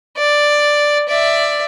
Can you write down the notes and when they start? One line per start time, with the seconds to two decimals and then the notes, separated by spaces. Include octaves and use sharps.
0.17 D5
1.08 D5 E5